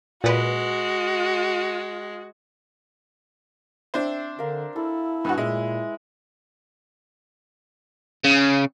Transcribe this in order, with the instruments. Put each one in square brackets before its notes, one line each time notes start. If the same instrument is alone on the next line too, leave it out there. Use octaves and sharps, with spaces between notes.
[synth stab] A#2 B4 [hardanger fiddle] G#3 [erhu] F#4
[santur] C4 E5 [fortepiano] D4 C5
[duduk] D3 [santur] A#4 F5
[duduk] E4 [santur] A4
[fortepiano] G2 B3 F#4 [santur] B4 G#5
[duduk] A#2 [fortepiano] G#3 [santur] E4 E5
[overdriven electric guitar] C#3